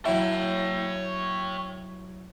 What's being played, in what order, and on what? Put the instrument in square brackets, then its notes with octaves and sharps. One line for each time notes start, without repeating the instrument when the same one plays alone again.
[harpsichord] F#3 E4 [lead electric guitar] C#5 G5